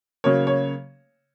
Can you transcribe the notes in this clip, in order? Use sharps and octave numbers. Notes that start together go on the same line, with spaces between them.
C#3 F#3 A#3 C#5
C#5